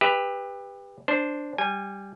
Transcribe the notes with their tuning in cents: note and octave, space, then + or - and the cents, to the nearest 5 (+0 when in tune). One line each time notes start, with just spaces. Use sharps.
G4 +25 B4 +0 E5 -20
D4 +0 C5 +0
G3 +0 G#5 -20